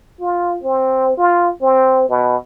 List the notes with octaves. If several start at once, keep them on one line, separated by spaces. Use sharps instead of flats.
F4
C4
F4
C4
B2